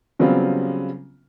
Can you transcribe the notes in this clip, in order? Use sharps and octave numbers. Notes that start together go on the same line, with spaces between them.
C#3 F#3 G3 B3 C4 F4